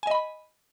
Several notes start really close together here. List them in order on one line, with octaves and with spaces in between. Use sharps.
G#5 D#5 B5